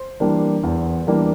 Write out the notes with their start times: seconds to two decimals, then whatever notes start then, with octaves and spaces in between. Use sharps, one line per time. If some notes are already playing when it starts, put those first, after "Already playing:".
Already playing: C5
0.20 E3 G3 A#3 D4
0.63 E2
1.07 E3 G3 A#3 D4